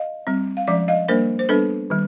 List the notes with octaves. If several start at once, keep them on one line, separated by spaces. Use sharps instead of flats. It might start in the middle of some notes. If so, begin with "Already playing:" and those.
Already playing: D#5 F5
G3 C4
F5
F3 G#3 C#4 D5 E5
D#5 F5
G3 A#3 D4 A#4 C5
C5
G3 B3 D4 A4 B4
D#3 G3